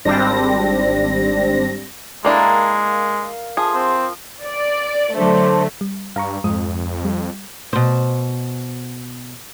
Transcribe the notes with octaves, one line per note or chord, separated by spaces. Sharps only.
G#1 G3 C4 D4 A#6
G#3 A#3 D4 E4 A#4 F5
F3 G#4
C4
D5
D3 F#3 A3 D4 C5
G3
G2 F5 A#5 C#6
F2 G#2 G#3 D#6
G3
B2 C5